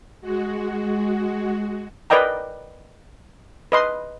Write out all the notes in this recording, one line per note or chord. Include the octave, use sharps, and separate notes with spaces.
G#3 F#4
A#4 B4 D5 D#5 G5 A#5
B4 D#5 C6